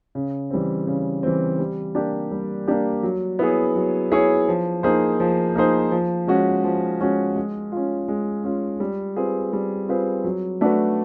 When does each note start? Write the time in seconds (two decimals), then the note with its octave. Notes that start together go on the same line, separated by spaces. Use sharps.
0.15 C#3
0.50 E3 G3 C4
0.87 C#3
1.23 E3 G3 C4
1.59 G3
1.95 A#3 D4 G4
2.32 G3
2.68 A#3 D4 G4
3.03 F#3
3.39 B3 E4 G#4 C#5
3.76 F#3
4.11 B3 E4 G#4 C#5
4.48 F3
4.83 A#3 D#4 G#4 C5
5.20 F3
5.55 A#3 D#4 G#4 C5
5.92 F3
6.27 G#3 C#4 F#4
6.64 F3
7.01 G#3 C#4 F#4
7.36 G#3
7.72 C#4 F4
8.08 G#3
8.44 C#4 F4
8.80 G3
9.16 C4 F4 G#4 B4
9.53 G3
9.89 C4 F4 G#4 B4
10.24 F#3
10.61 A3 D4 F#4 B4